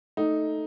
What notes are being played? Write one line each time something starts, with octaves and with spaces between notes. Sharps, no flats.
A3 D#4